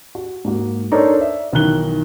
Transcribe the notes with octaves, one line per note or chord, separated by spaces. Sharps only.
F#4
G#2 A#3 F#4
D4 D#4 A4 A#4 C5 C#5
D5 E5
B1 D#3 E3 F#6 G7